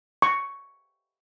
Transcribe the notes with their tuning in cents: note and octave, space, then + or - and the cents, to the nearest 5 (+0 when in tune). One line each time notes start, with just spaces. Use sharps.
C#6 +5